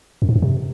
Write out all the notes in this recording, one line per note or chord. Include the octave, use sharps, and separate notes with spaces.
F#2
G#2
F#2
C3